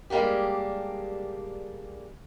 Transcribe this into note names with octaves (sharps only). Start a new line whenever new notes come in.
G3 G#3 A#3 D4 G4